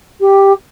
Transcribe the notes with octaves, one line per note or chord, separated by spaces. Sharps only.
G4